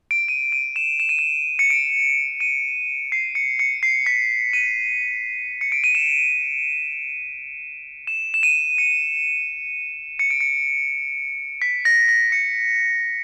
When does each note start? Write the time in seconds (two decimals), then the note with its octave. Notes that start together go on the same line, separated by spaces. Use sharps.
0.11 D7
0.28 D#7
0.52 D#7
0.76 E7
1.00 E7
1.09 D#7
1.19 E7
1.59 C#7
1.70 D7
2.40 D#7
3.12 C7
3.35 C#7
3.59 C#7
3.83 C7
4.06 B6
4.53 D#7
5.61 C#7
5.72 D7
5.84 D#7
5.95 E7
8.07 E7
8.34 E7
8.43 D#7
8.78 C#7
10.19 C#7
10.31 D7
10.41 C#7
11.62 B6
11.85 A#6
12.09 A#6
12.32 C#7